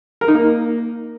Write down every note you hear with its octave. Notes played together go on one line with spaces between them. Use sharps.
A#4
D#4
A#3